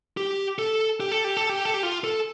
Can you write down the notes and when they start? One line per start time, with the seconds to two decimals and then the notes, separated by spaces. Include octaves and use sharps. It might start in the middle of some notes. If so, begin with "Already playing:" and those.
0.17 G4
0.59 A4
1.00 G4
1.12 A4
1.24 G4
1.37 A4
1.49 G4
1.65 A4
1.74 G4
1.83 F4
2.04 A4